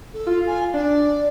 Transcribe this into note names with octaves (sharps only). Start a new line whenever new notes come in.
A4
F4
G#5
D4 D5